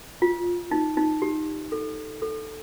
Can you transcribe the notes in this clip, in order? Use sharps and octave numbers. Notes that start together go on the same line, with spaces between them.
F4
D#4
D#4
G4
A4
A4